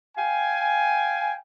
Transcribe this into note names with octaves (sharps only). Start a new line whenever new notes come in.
F5 G5 G#5